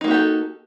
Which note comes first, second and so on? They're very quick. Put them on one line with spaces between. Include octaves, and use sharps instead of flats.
D#4 A#3 F#4 G4 A4